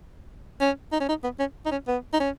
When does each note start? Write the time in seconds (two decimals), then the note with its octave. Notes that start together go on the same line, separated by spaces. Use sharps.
0.61 C#4
0.92 D#4
1.00 C#4
1.09 D#4
1.24 B3
1.39 C#4
1.66 D#4
1.71 C#4
1.88 B3
2.13 D#4
2.20 C#4